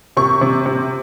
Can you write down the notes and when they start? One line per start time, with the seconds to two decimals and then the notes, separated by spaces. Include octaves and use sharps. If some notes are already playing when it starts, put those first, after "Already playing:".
0.17 C3 C#6
0.41 C3
0.66 C3